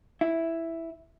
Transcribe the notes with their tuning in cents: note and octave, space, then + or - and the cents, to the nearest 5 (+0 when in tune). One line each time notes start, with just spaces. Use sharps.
E4 +0